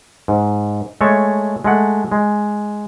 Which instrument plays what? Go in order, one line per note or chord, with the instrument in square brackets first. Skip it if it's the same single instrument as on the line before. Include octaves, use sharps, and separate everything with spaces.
[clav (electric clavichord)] G#2
G#3 A3 A4 C#5
G#3 A3 F#5
G#3